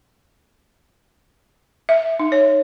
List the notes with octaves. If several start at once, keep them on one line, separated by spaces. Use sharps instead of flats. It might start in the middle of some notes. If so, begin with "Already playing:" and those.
E5
D#4
C#5